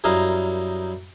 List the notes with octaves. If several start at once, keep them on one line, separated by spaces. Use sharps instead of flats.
F#2 G3 E4 A#4 D#5 F5